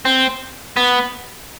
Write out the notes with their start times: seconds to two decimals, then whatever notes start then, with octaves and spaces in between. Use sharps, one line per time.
0.05 C4
0.77 B3